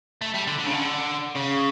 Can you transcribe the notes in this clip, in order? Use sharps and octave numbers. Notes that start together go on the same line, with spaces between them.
A3
G3
D3
D3
C#3
D3
C#3